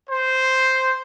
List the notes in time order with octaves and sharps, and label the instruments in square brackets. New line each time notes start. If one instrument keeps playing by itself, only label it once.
[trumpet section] C5